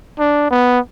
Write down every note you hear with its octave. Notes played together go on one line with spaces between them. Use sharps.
D4
B3